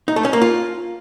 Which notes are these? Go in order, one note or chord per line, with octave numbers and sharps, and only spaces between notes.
D#4
A3
C#4
A#3
F4